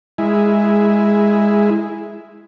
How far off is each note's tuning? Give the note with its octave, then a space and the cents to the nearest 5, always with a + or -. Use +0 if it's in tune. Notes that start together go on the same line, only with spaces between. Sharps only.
G#3 -10 E4 +0 G#4 +0